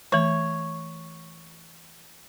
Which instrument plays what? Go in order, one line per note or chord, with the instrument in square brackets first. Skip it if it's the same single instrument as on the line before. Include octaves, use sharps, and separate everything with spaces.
[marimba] E3 A3 [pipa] C#5